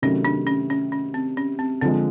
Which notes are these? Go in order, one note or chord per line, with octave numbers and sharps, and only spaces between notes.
C3 D#3 F#3 A3 C#4
D4
C#4
C#4
C#4
C4
C#4
C4
D3 F3 G#3 C4